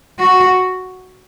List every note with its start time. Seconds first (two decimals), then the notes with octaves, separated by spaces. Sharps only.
0.20 F#4